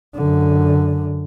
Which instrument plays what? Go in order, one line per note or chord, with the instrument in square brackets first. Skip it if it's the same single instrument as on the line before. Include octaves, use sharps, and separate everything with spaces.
[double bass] F#2 D3